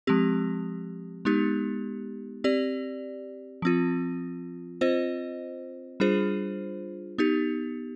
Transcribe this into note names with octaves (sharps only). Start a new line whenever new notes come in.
F3 G#3 C4 G4
G#3 B3 D#4 G4
C4 G4 D5
F3 C4 F4
C4 F4 C5 D#5
G3 D4 F4 G#4 C5
B3 D#4 G4